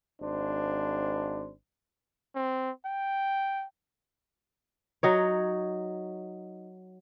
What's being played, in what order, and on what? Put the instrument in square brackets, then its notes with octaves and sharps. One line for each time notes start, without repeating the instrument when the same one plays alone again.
[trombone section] G#1 D4 C5
[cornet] C4
G5
[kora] F#3 D#4 C#5